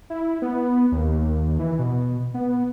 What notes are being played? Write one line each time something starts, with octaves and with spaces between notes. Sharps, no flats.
E4
B3
D#2
D#2
E3
B2
B3